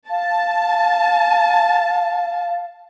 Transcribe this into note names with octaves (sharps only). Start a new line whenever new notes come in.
F5 A5